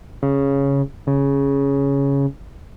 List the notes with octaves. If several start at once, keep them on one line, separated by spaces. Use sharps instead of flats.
C#3
C#3